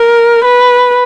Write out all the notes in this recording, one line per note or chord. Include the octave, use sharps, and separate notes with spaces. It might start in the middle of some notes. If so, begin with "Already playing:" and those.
Already playing: A#4
B4